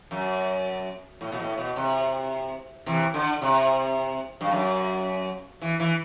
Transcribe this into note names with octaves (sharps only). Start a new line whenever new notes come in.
F#2
A2
B2
A2
B2
C3
C3 E3
D3
C3
G2
F#2
E3
E3